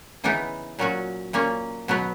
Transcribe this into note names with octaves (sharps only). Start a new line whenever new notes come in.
C#3 E3 B3 D#4
A#2 F#3 C#4 F#4
A#2 A#3 C#4
B2 F#3 B3